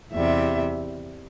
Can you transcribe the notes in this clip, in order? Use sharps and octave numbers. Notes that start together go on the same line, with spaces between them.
E2 C3 G3 E5